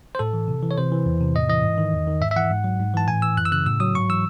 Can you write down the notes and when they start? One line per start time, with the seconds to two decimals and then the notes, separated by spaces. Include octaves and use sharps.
0.15 C5
0.19 A2 A4
0.33 E3
0.48 C3
0.63 E3
0.71 C#5
0.78 C3 C5
0.92 E3
1.06 E2
1.21 C3
1.35 A2 D#5
1.49 E3 D#5
1.64 G#2
1.78 D#3
1.93 E2
2.08 D#3
2.21 G#2 E5
2.31 E5
2.36 E3 F#5
2.51 G#2
2.64 F#3
2.79 G#2
2.94 E3 A5
3.08 A2 G#5
3.22 E3 E6
3.37 F#2 F#6
3.45 E6
3.52 C#3 F#6
3.66 A2 E6
3.80 F#3 D#6
3.95 G#2 C#6
4.09 E3 E6